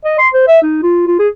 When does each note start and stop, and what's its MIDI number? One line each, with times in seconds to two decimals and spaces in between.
0.05 0.15 75
0.19 0.28 84
0.33 0.43 72
0.47 0.58 76
0.62 0.81 63
0.83 1.05 65
1.07 1.16 65
1.19 1.28 68